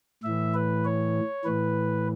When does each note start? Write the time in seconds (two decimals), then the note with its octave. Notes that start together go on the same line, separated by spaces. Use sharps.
0.23 A2 E3 E5
0.54 B4
0.85 C#5
1.45 A2 E3 B4